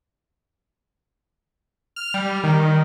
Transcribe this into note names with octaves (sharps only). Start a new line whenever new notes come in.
F6
G3
D#3